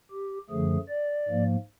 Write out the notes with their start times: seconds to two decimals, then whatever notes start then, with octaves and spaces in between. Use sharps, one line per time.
0.11 G4
0.49 F#2 D3 F3 A3 G#4
0.89 D5
1.28 G#2 F3 A#3